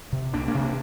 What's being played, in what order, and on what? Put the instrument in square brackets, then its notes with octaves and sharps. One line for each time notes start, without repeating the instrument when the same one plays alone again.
[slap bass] C3
C2 A#3 D4
A#3 D4
C3
A#3 D4